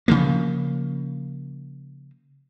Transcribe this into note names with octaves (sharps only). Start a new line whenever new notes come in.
C#3 F3 A#3